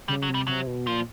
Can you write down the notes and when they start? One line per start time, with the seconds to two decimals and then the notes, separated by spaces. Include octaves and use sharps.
0.08 C#3 G3
0.23 F#3
0.29 C3
0.34 G3
0.47 C3 F#3
0.67 B2
0.87 A#2 F3